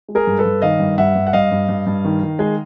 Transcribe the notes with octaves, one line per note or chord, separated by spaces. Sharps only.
G#3
G#4 A#4
G2
A4 B4
G2
D#3 D#5 F5
G2
G2 E5 F#5
G2
F#5
G2 D#5 F5
G2
G2
G2
D#3
D#3
G#3